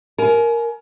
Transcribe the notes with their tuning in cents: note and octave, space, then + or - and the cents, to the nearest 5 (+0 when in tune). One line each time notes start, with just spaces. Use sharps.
A#4 +0 G#5 +35